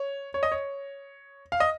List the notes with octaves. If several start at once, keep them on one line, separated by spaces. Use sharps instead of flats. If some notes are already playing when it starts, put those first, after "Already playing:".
Already playing: C#5
C#5
D#5
C#5
F5
D#5